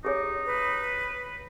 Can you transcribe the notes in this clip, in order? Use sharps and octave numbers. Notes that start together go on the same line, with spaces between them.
D#4 G4 G#4 C#5
B4